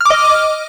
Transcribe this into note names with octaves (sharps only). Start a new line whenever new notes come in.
D#5 D6 F6